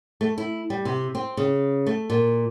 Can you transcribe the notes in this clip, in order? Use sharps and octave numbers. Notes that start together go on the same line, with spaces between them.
A3
E4
G3
C3
C4
C#3
A3
A#2